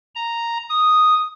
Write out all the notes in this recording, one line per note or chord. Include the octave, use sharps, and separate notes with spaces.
A#5
D#6